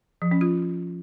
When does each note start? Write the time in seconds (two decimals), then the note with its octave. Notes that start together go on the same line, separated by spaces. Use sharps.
0.22 F3
0.31 C#4
0.41 F4